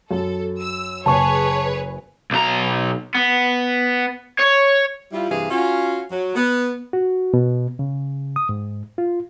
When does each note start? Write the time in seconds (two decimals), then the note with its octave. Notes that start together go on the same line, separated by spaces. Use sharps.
0.11 F#2 A4
0.62 E6
1.06 F#1 G#4 B4 C#5 G#5 A5 C#6
2.31 B1 A#5
3.15 B3
4.39 C#5
5.12 G3 E4 F4
5.30 G2 C3 E3 G#4 E5 F5
5.50 C#4 F4 F#4
6.11 F#3
6.36 B3
6.93 F#4
7.34 B2
7.79 C#3
8.36 D#6
8.49 G#2
8.98 F4